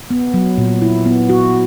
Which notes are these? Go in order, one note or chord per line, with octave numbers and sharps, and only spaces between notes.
B3
F#3
A#2
E4
B3
F#4